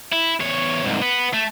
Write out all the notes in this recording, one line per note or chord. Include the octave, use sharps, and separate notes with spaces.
E4
E2 C#5
C2 G#2
B3
A3